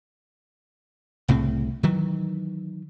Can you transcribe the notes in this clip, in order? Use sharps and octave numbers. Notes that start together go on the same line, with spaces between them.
C2 A2 C#3 C4
D#3 E3 F#3